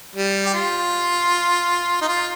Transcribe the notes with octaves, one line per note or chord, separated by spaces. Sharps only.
G3
G4
F4
D#4
F4